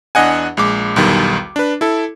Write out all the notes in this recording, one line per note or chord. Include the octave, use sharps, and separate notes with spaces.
E2 D4 D#5 F#5 G#5
A#1 G#3 D6
B1 E2 D#3 G3
D4 B4
E4 A4